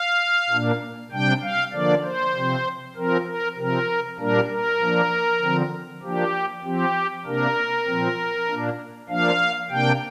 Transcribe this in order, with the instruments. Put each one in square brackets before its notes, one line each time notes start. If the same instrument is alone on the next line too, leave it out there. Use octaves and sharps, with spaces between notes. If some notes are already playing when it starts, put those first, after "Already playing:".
Already playing: [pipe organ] F5
A#2 A#3 D4
C3 G3 D4 G5
F5
D3 F3 A#3 D4 D5
C5
C3 F3 C4
F3 C4 A#4
A#4
C3 F3 C4 A#4
A#2 G3 A#3 D4 A#4
A#4
F3 A#3 D4
D3 F3 C4
F3 A#3 D4 G4
F3 C4 G4
C3 A#3 D4 A#4
A#2 F3 C4
A#2 A#3 D4
F3 A#3 D4 F5
C3 A#3 D4 G5